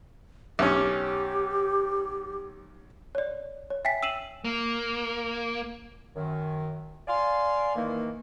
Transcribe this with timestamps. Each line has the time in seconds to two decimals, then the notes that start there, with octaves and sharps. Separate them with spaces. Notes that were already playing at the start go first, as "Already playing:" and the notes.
0.59 B1 C#4 G4
3.15 C#5 D5
3.70 C#5
3.85 E5 G5 G#5 A6 B6
4.03 E6 C7 D#7 E7 F#7
4.45 A#3
6.15 F#2 D#3
7.08 D5 F5 G#5 C6
7.75 D#3 E3 A#3